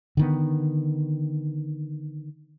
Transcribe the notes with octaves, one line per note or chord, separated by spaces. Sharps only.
D3 D#3 B3